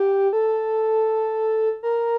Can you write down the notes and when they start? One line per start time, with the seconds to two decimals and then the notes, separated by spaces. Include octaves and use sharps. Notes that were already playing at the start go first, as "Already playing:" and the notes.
Already playing: G4
0.33 A4
1.83 A#4